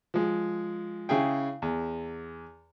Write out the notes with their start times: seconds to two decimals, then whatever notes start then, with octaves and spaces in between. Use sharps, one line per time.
0.14 F3 G#3
1.09 C#3 E4 G#4 G5
1.62 E2